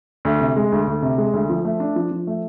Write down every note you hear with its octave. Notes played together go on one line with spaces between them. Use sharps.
D2
C3
G#3
D2
D2
C3
G#3
D2
F3
A3
D4
F3
F3
A3